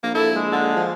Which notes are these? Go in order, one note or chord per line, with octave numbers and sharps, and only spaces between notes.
A#1 A#3
E4 A4
G#3
D3
F3